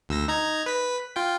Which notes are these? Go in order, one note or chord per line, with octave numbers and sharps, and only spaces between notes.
D2 E6 A#6
D#4 A#5 G#6
B4 B6
F4 G5